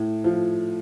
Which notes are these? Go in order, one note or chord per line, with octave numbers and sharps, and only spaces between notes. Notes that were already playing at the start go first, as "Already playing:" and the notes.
Already playing: A2
F3